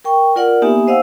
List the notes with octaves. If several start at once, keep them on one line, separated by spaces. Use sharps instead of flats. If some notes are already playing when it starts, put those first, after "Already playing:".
A#4 G5 C#6
F4 A#4 D5 F#5
A#3 B3 D#4 G4 E5 G#5
C5 D#5 F5 F#5 E6